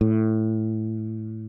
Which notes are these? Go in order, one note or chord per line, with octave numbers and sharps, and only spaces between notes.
A2